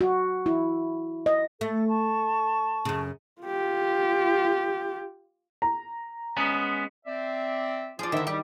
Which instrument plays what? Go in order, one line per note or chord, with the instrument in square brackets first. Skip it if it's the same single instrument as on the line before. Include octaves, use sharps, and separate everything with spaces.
[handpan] F#4
E4
D#5
[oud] A3 [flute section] A4
[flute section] A5 C#6
[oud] F#2 C#3
[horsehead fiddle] F4 G4
[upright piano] A#5
[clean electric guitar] G#3 B3 C#4
[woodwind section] C4 D5 E5
[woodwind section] F3 F4 [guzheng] G#4 D5
[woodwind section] D3 C5 E5 [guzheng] D#3 E4
[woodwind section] G3 [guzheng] G4